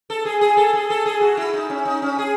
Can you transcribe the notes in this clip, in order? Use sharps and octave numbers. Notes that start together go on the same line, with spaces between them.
A4
G#4
G#4
A4
G#4
A4
G#4
F#4
E4
D#4
C#4
D#4
C#4
G#4